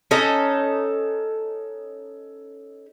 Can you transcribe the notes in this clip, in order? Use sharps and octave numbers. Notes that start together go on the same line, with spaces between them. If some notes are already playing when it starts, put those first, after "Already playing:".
C#4 D#4 A4 D#5